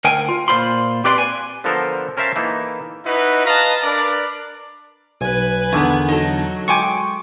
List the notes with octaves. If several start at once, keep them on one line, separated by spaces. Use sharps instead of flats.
D2 A#4 G5 G#5
F4
A#2 F4 C5 B5 C6
C4 G4 B4 D5 B5 C6
G#5
D3 F3 B3 A4 A#4 C5
C#4 A#4 C5 E5 F5 A5
E3 A#3 D#4 A4
D#4 E4 F#4 B4
B4 D#5 F5 A5 A#5
D4 A#4 B4 D5
B1 B4 G#5
E2 D3 D#3 B3
F#3 D#4 A4
G#3 G5 G#5 C#6 D6